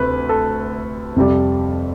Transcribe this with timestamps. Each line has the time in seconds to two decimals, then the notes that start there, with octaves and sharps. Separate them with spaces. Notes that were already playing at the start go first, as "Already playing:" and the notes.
Already playing: D2 C3 B4
0.29 A4
1.16 F2 C3 G3